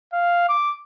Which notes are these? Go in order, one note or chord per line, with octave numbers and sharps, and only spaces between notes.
F5
D6